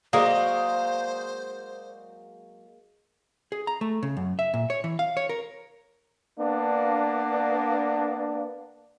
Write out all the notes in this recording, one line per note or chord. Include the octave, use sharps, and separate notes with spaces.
F#3 G#3 A#3 C5 D5 F5 D#6
G#4
A#5
A3
C#3
F#2
E5
A#2
C#5
E3
F5
C#5
A#4
A#3 B3 D4